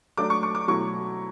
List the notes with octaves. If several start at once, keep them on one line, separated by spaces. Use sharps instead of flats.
F#3 A3 D4 D6
C#6
C#6
D6
B2 F#3 A3 E4 C#6